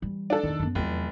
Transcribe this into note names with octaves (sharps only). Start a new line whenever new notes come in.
E3 G3
D4 A4
E2 D#3 E4
F#2 B3
F1 E2 F#3 F4